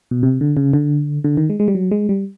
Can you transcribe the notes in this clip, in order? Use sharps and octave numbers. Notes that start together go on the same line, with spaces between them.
B2
C3
D3
C#3
D3
D3
D#3
G#3
G#3
G3
F#3
G#3
G3